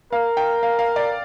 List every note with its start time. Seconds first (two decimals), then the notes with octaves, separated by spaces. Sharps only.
0.13 A#4 F5
0.37 G5
0.63 F5
0.79 F5
0.96 D5